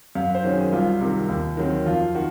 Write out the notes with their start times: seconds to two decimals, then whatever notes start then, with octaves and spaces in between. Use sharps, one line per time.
0.15 F#2 F5
0.35 C5
0.43 D#3 F#3 C#4
0.53 G#4
0.72 C2 F4
1.01 C3 D#3
1.29 D#2
1.57 D#3 F#3 C4
1.86 F2 F4
2.15 D#3 F#4